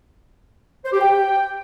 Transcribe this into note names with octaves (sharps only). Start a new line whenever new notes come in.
C5
G4
G5